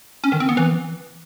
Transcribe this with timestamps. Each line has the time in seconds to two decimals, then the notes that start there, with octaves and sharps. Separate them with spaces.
0.24 C#4
0.32 D#3
0.40 C4
0.49 B3
0.57 E3